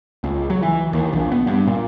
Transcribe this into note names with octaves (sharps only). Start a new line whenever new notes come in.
C#2
F#3
E3
D#2
A#1
B3
G2
A#2